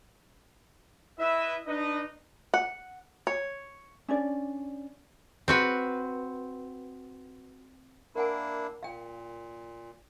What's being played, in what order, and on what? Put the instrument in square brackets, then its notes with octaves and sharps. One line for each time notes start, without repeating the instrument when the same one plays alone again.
[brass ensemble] E4 B4 D#5 E5
D4 D#4 B4 D#5
[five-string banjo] F#5
C#5
[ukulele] C#4 D4 D5
[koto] C4 F#4 B4
[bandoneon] A#3 D4 E4 [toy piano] A#4 F#5 G#5
[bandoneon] A#2 [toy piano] F5 G5